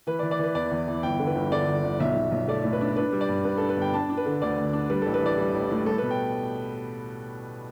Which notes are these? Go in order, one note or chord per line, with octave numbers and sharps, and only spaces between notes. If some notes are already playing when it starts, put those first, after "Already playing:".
E3 B4
D5
E3
D5
E3 B4
E2 D5
E2
E3
G1 G5
D3
B4
G1
D3 D5
G1
G1
B1 E5
B1
B1
A3 D5
A2
B4
D4
D4 B4
G3
D5
G2
G2 B4
A4
D4
B4
G1 G5
D4 A5
D4
B4
D3
D2 D5
D2
D4
G3 B4
A4
A1
B4
E3 D5
G3
A1
A2
G3 A4
B4
B2
G5